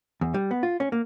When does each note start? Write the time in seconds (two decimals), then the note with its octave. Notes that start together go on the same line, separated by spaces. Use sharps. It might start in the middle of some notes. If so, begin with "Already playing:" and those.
0.21 E2
0.34 G3
0.51 B3
0.63 F4
0.80 C#4
0.92 A#3